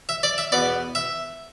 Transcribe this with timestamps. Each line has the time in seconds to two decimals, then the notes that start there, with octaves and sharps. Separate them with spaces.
0.09 E5
0.23 D5
0.38 E5
0.52 E2 B2 B3 D5
0.95 E5